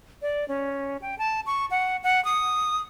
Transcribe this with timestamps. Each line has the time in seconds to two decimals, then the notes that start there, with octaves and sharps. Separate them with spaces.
0.22 D5
0.48 C#4
1.02 G5
1.19 A5
1.46 C#6
1.71 F#5
2.03 F#5
2.25 D#6